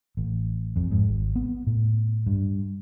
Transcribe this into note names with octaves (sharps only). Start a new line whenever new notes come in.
A1
F2
G#2
G#1
B3
A2
G2